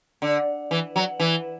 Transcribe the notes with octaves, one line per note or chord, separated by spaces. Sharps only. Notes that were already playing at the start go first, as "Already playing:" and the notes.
D3
E3
F#3
E3